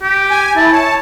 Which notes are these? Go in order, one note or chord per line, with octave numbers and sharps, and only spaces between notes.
G4
G#5
E4 A5
C#5 A5